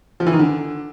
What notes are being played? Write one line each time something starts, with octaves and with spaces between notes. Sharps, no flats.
F3
E3
D#3
D3